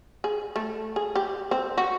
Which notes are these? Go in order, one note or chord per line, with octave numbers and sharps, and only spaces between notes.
G#4
A3
G#4
G4
C4
F#4